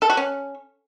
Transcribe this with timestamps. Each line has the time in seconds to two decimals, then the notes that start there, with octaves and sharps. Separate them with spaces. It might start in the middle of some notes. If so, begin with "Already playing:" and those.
0.02 A4
0.10 F#4
0.17 C#4